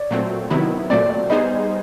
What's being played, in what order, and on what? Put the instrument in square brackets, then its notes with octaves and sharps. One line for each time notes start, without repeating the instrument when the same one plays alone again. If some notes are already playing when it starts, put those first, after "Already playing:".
Already playing: [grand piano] C#5 D5
[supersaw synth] A#2 F#3 A3 C4
C3 D#3 F#3 B3 E4
[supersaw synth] A#2 F#3 A3 C4 [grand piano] D5
[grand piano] D5
[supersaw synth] G3 B3 D#4 G#4 C5 [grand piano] D#5